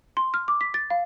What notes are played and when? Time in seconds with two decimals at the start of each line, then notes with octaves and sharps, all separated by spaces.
0.17 C6
0.34 F6
0.48 D6
0.61 B6
0.74 A6
0.90 F5